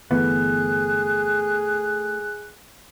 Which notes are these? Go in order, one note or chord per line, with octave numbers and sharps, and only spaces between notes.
G1 E3 A3 B3 G#4 F#6